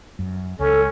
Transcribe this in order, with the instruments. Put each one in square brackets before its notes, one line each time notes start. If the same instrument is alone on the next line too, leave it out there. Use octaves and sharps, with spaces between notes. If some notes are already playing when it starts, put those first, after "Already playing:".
[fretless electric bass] F#2
[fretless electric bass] C#2 [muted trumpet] C#4 [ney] A4